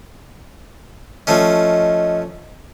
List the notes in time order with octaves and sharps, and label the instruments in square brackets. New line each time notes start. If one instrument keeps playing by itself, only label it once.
[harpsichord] F3 A3 C#4 [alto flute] D#5